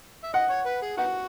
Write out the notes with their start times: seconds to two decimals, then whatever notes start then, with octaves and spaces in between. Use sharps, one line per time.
0.23 E5
0.33 D#5 F#5
0.50 C#5
0.66 B4
0.82 G#4
0.98 B3 D#4 F#4 F#5